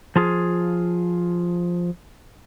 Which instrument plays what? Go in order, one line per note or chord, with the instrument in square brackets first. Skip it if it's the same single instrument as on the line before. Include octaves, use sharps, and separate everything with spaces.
[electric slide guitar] F3 F4 G#4